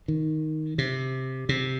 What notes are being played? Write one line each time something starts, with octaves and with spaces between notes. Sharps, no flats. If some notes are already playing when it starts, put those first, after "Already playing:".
D#3
C3
C3